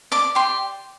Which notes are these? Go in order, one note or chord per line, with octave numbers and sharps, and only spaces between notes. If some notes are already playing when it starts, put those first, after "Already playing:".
D5 D6
G4 C6